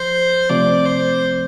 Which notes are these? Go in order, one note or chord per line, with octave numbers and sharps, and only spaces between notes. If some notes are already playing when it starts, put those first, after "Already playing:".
Already playing: F3 C5
C3 F3 A3 C4 D5
C5